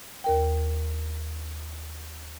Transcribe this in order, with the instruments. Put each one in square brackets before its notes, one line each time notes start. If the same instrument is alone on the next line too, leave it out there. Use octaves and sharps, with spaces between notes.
[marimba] D#2 A#4 G5